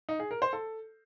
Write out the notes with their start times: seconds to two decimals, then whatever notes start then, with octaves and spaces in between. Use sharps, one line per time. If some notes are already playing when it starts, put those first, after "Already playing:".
0.09 D#4
0.20 G#4
0.31 A#4
0.42 C5
0.53 A4